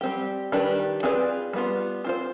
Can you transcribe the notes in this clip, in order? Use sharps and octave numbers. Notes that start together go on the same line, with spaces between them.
G3 C4 G4
D#3 G3 D4 G4 B4
C4 F4 G#4 B4 D5
G3 B3 F4
C4 F4 C5